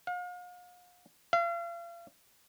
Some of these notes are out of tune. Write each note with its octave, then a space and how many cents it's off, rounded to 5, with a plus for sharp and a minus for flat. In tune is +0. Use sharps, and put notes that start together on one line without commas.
F5 +40
F5 -40